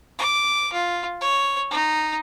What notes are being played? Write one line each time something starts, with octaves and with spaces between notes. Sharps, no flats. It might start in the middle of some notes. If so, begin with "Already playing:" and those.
D6
F4
C#5
D#4